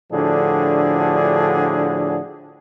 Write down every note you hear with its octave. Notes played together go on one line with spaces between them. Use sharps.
A2 D3 F3 D4 F#4 G#4